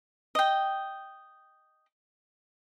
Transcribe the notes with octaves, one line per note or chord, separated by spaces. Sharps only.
D#5 G5